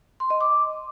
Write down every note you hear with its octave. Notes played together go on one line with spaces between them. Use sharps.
C6
D#5
D6